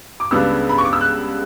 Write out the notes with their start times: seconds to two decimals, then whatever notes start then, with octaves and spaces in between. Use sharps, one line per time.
0.20 D6
0.31 C#2 C#3 G3 B3 D4 E6
0.69 B5
0.78 C#6
0.85 D6
0.93 E6
1.01 F#6